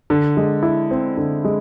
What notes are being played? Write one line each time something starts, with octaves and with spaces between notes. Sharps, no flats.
D3
G#3
E4
C4
D3
G#3